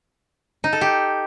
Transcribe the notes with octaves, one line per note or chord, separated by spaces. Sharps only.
D#4
A4
G4